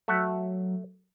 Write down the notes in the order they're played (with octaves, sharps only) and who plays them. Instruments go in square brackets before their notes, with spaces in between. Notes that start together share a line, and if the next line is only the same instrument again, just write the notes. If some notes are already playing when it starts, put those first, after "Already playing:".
[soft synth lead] F#3 [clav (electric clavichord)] A3 E5 F#5